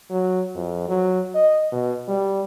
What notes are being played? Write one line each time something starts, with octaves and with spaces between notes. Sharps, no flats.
F#3
F2
F#3
D#5
B2
G3